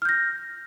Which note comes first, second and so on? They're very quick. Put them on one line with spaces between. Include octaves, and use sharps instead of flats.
F6 G6 A#6